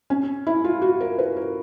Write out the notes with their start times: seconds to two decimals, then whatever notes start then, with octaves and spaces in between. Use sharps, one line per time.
0.10 C#4
0.47 E4
0.64 F4
0.82 F#4
1.00 A#4
1.19 B4
1.36 A#4